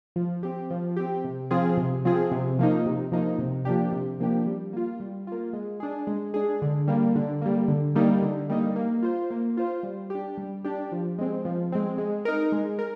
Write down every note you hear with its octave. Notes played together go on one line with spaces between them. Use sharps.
F3
C4 G4
F3
C4 G4
C3
F3 C4 F4 G#4
C3
F3 C4 F4 G#4
C3
F3 A#3 D#4
C3
F3 A#3 D#4
C3
F3 A#3 D4 G4
C3
F3 A#3 D4 G4
G3
A#3 F4
G3
A#3 F4
G#3
D4 G#4
G#3
D4 G#4
D3
G3 A#3
D3
G3 A#3
D3
G3 A#3 D#4
D3
G3 A#3 D#4
A#3
F4 C5
A#3
F4 C5
G3
D4 G4
G3
D4 G4
F3
G#3 C4
F3
G#3 C4
G#3
D#4 A#4
G#3
A#4